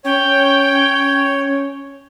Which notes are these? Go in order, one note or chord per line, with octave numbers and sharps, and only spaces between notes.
C#4 C#5 G5